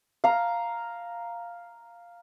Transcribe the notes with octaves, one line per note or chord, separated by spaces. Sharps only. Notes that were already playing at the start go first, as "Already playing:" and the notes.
F5 A#5